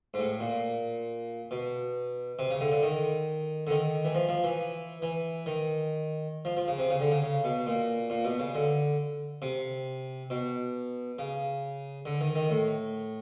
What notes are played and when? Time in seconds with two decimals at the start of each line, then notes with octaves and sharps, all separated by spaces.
0.14 G#2
0.19 A2
0.40 A#2
1.51 B2
2.39 C3
2.50 C#3
2.61 D3
2.72 D3
2.83 D#3
3.67 D3
3.71 D#3
4.05 E3
4.15 F3
4.29 F3
4.44 E3
5.02 E3
5.46 D#3
6.45 F3
6.57 F3
6.68 C#3
6.78 C3
6.90 C#3
7.00 D3
7.12 C#3
7.22 C#3
7.44 B2
7.67 A#2
8.10 A#2
8.25 B2
8.39 C#3
8.55 D3
9.42 C3
10.30 B2
11.19 C#3
12.06 D3
12.21 D#3
12.36 D#3
12.50 A2